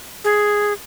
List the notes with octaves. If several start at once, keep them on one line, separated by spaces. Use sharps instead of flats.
G#4